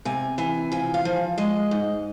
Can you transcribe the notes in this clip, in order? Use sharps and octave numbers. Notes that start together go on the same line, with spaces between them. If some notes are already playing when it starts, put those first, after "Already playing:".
C3 G#5
E3 G#5
F3 G#5
F5
F3
G#3 D#5
G#2